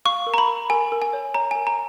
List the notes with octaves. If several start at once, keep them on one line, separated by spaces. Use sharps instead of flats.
F5 C#6
A#4
A#5
B5
A#4
A#4 G#5
A#4
G#5
C#5
C#5 A#5
G#5
A#4
A#5